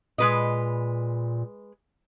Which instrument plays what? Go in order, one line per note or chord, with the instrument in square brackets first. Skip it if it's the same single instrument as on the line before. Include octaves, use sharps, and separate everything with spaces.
[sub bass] A#2 [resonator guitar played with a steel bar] G#3 B4 D#5